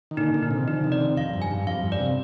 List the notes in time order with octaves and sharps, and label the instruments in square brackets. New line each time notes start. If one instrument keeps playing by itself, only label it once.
[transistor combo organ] D#3
[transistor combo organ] A#2 D3 [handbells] D#4
[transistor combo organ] A#2 D3
[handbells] D#4
[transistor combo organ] C3 D#3
[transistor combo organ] D3 F3 [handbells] D#4
[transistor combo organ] C3 D#3
[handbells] D5
[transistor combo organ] C3 D#3
[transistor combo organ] F2 [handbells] F5
[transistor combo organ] G2
[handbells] G#5
[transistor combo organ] G2
[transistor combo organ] F2 [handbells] F5
[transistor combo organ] G2
[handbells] D5
[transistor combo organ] C3